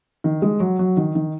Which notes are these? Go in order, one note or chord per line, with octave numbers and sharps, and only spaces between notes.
D#3
G#3
F#3
F#3
D#3
D#3